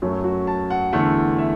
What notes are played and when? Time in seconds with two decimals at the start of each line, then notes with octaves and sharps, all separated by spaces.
0.02 F#2 F#3 A3 F#4
0.24 F#4
0.47 A5
0.70 F#5
0.93 E2 D3 A3 F#5
1.38 E5